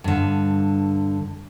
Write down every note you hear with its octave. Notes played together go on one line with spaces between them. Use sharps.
G2 D3